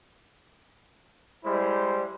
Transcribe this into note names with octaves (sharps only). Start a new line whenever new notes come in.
G3 G#3 E4 C5